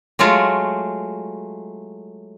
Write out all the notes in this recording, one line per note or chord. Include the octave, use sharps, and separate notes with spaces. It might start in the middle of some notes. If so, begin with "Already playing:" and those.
F#3 G#3 A3 F4 C#5